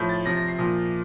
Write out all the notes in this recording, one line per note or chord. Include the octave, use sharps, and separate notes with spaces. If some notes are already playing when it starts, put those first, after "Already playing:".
Already playing: A2 F3 G6
A6
C3 F3 A#6
A#6
C7
A#2 F3